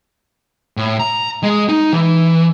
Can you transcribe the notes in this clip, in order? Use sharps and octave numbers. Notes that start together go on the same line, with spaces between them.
A2
A#5
G#3
D#4
E3